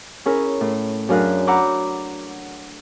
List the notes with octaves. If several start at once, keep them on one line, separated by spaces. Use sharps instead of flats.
C#4 E4 G#4 A#4
A2
F#2 D4 G#4 A#4 F5 F#6
F#5 A#5 B5 D6 E6 G6